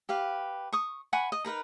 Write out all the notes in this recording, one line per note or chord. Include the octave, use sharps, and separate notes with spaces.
G4 B4 F5
C#6 D#6
F#5 G#5 B5 C#6
D#5
D#4 A#4 B4 A#5